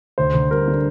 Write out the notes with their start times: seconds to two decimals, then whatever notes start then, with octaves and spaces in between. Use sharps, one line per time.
0.18 D2 C5
0.34 D2
0.51 G3 A#4
0.68 D3